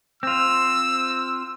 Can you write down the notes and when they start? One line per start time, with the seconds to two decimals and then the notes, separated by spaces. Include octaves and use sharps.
0.23 C4 F4 E6